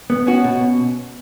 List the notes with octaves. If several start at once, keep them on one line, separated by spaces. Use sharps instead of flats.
B3
C#4 F#4
B2